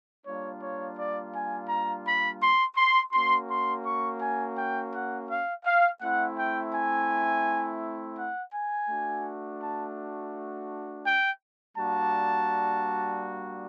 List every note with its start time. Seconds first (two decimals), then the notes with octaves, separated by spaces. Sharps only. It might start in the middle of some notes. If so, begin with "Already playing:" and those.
0.25 G3 A#3 D4 F4 C#5
0.61 C#5
0.96 D5
1.32 G#5
1.68 A#5
2.05 B5
2.41 C6
2.76 C6
3.12 A#3 C#4 F#4 C6
3.49 C6
3.85 C#6
4.20 G#5
4.56 G5
4.92 F#5
5.29 F5
5.64 F5
6.01 A3 C4 E4 F#5
6.36 G5
6.72 G#5
8.17 F#5
8.52 G#5
8.88 A3 D4 F#4
9.60 A5
11.04 G5
11.76 G3 A#3 D4 F#4 A5